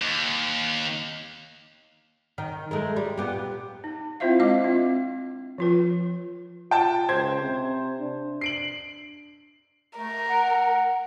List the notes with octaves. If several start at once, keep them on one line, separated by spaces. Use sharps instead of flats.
D#2
D#3
G#3 A3 A#4
G3
A#2 B3 G4
D#4
C4 E4 F4 C5 E5 F5
G#3 D4 D#5 F5 D6
C4 F4
F3 F4 B4
F4 G5 A5
C#2 C5 G#6
C3
D4
C7 D7 F#7
A3 A#4
F#5